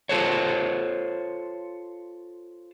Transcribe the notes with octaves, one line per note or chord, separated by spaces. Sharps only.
F4 A4 C5 C#5